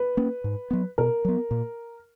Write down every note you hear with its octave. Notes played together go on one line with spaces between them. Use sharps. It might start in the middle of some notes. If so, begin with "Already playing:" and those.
Already playing: B4
A#3 C#4
G#2
F#3 B3
B2 A#4
F#3 B3
A#2